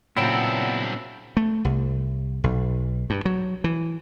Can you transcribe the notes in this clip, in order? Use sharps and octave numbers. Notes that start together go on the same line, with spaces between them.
A#2 C#3 F#3 B3 C4 D4 E4 G5
A3
C2
B1
G2
F#3
E3